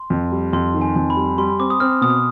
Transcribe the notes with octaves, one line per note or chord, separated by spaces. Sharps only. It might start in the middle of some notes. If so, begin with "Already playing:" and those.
Already playing: C6
F2
G3
F2 C6
D#3
G#5
F2
B5
G3
G3 C6
C4 D6
D#6
C4 F6
B2 D#6